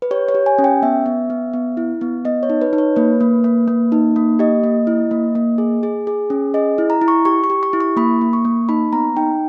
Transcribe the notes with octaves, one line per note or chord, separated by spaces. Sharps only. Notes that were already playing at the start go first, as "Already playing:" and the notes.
B4
G4 C#5
C#5
G4
G#5
C#4
G5
B3 E5
B3
B3
B3
E4
B3
B3 D#5
C#5
D#4
B4
D#4
C#5
A#3 B4
A#3
A#3
A#3
D#4
A#3
G4 D#5
A#3
E4
A#3
A#3
G#4
G#4
G#4
C#4
G#4 D#5
E4
A#5
E4
C#6
G4 C#6
C#6
G4
C#6
E4
C#6
A#3 B5
A#3
C#6
A#3
D#4 B5
B3 A#5
D#4 G5